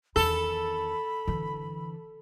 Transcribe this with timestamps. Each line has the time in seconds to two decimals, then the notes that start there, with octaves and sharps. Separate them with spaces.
0.16 E2 D#3 A4 B5
1.28 D3 E3